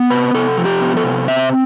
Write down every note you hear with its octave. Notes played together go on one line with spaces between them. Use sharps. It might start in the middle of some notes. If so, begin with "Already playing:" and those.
Already playing: B3
C3 B4
C3 A4
F3
G4
B3
A4
C3
C4 E5